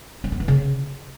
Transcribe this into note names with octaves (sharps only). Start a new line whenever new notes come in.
C4
B3
E3
C#3